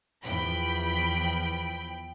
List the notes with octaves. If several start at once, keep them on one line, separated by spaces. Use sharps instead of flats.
E2 F3 G5 B5